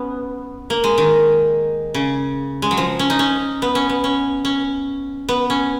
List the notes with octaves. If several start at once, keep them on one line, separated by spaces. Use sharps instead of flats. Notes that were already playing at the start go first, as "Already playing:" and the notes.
Already playing: B3 C#4
A#3
G#3
D#3
C#3
G#3
F#3
F3
C#4
D#4
C#4
B3
C#4
B3
C#4
C#4
B3
C#4